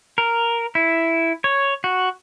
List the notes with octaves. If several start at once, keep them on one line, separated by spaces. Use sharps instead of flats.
A#4
E4
C#5
F#4